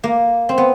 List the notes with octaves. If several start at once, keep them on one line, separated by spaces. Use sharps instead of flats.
A#3
C4
B3